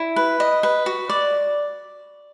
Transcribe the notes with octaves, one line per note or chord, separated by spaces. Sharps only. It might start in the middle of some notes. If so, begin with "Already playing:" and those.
Already playing: E4
B4
D#5
B4
F#4
D5